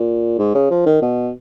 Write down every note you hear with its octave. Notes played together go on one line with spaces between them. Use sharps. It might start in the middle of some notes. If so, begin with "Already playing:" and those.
Already playing: A#2
G#2
C#3
F3
D#3
B2